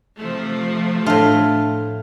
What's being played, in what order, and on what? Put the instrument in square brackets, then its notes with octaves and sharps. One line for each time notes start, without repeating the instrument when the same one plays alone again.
[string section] C3 F3 A3
[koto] A2 F4 [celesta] D4 E5 A5